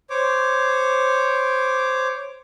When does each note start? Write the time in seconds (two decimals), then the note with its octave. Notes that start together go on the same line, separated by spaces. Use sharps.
0.10 C5 C#5 D6